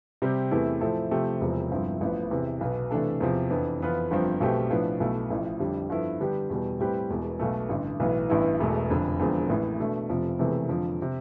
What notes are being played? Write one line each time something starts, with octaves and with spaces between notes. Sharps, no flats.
C3 G3 C4 G4
E2 C3 E3 A3 E4
A2 F3 C4 E4 A4
C3 F3 A3 C4 G4
E1 E2 C3 F3
G1 G2 F3 C4 E4
A1 A2 F3 B3
E2 C3 E3
B1 B2 B3
C3 E3 A3 D4 A4
E2 C3 F3
F2 E3 B3 D4
F2 E3 B3 F4 B4
G1 G2 F3 C4
B1 B2 A3 C4 G4
A2 F3 B3 D4
B1 B2 A3 E4
A1 A2 F3
F2 D3 G3
G2 F3 B3 E4 A4
D3 G3 B3 D4 G4
E2 B2 G3
A2 G3 C4 G4 B4
E1 E2 B2
B1 B2 A3
A1 G2 D3
B1 A2 E3 B3
A1 G2 E3 B3 E4
E1 E2 B2 A3
F1 F2 D3
E1 E2 D3 F3 C4
A1 A2 E3 B3
B2 A3 D4
F1 F2 C3 F3
E1 E2 C3 E3 A3
F2 D3 F3
C3